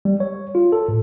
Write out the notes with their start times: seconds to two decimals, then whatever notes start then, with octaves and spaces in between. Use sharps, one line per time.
0.05 G3
0.20 C#5
0.55 F4
0.72 A4
0.88 A2